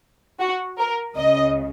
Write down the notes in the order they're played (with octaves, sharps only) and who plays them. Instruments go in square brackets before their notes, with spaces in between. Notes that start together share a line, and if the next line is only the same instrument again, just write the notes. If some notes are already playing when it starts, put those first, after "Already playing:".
[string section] F#4
A#4
C#2 C#3 D#5